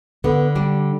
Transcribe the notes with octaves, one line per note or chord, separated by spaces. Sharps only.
D3 B3
G3 D4